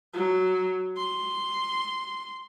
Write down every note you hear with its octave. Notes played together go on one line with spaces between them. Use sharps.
F#3
C6